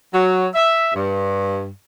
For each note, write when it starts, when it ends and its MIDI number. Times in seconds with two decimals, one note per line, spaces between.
0.14 0.47 54
0.55 0.90 76
0.95 1.68 43